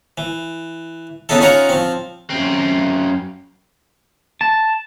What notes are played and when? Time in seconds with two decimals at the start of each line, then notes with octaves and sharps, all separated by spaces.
0.18 E3
1.29 C#3 B3 D#4 E4 A4
1.41 C#4 D#4 F4 C#5 F#5 A#5
1.69 F3 C4
2.30 F#2 C4
4.41 A5